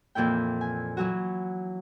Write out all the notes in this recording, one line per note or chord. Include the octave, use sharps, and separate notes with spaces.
F2 A#2 E3 E4 G5
G#5
E3 F#3 F#4